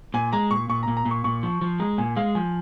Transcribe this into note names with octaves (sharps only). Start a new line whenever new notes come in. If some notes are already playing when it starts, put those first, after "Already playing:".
A#2 G#5
G#3 A#5
A#2 C#6
A#2 C#6
A#5
A#2
A#5
A#2
C#6
A#2 C#6
F3
F3
G#3 A#5
A#2 G#5
G#3 F5
F3 G#5